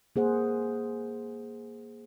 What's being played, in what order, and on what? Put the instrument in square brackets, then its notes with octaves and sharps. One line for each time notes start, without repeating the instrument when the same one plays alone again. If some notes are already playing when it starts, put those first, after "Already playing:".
[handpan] A#3 G#4 C5 F#5